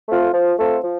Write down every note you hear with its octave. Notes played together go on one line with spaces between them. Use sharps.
A3 C4 F4 A4
F3
A3 C4 F4 A4
F3